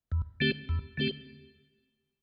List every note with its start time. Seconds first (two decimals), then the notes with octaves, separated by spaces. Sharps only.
0.12 E2
0.40 D3 A3 C4 G4
0.69 E2
0.97 D3 A3 C4 G4